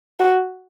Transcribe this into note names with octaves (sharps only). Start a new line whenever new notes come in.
F#4